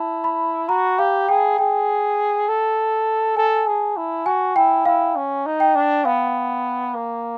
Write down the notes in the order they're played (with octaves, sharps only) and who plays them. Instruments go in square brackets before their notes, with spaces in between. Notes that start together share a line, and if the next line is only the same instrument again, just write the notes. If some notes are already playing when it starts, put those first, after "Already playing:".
Already playing: [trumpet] E4 [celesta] A5
[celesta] B5
[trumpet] F#4 [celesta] A#5
[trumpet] G4 [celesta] F5
[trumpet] G#4 [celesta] G5
[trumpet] G#4 [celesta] G5
[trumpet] A4
[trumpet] A4 [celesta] G#5
[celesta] A5
G#5
[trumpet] G#4
E4
[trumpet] F#4 [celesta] G#5
[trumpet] E4 [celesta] G5
[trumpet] E4 [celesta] F5
[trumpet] C#4
D#4
[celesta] G5
[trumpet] D4
[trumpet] B3 [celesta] F5
[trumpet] A#3